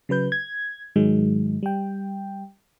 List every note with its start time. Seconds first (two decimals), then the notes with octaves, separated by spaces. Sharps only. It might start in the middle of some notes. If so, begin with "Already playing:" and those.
0.09 C#3 F#3 B4 G6
0.32 G#6
0.96 G#2 D#3 F#3 G#3
1.63 G3 G5